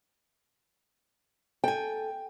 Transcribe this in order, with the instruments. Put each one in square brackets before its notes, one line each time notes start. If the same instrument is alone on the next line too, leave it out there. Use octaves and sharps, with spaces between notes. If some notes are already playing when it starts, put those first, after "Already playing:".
[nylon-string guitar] A4 G#5 [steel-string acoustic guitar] G5